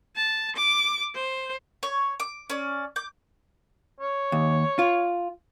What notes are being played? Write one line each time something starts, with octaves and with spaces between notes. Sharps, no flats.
A5
D6
C5
C#5
D6
C#4 D5
D6 G6
C#5
D#2
F4